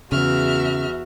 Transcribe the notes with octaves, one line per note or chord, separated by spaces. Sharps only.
E2 C#3 F#4 E5 F6